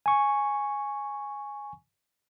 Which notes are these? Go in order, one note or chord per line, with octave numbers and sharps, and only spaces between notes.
G#5 C#6